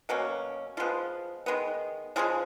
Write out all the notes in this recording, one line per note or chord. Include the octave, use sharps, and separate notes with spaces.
B2 F#3 A#3 C#4
F3 G#3 B3 F4
D#3 G#3 B3
C#3 F3 G#3 F4 G#4